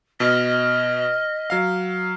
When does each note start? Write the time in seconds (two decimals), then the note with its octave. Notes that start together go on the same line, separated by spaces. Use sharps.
0.20 B2 D#5 F6 B6
1.50 F#3 F5